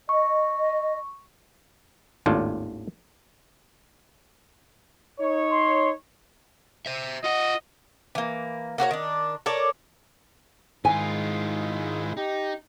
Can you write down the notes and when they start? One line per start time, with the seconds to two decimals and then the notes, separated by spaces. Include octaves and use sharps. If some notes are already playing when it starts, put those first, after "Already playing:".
0.09 D#5 C#6
2.26 G#1 D#2 A2 D4 F4
5.19 D#4 C#5
5.51 C6
6.86 C5 E5
7.24 F4 D#5 F#5
8.15 E3 A#3
8.78 A#3 F#4 A4 C#5
8.91 D#3 D4
9.46 A4 A#4 C#5 D5
10.85 G#2 D#3 G#3 E4 F4 G#5
12.17 D#4 G4